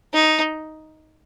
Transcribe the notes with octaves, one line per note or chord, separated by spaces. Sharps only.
D#4